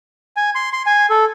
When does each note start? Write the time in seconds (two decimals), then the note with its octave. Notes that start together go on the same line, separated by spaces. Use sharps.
0.37 G#5
0.55 C6
0.73 C6
0.86 G#5
1.10 A4